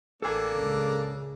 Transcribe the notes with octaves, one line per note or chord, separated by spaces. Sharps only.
A1 A#3 D4 A4 G#5
C#2 C#3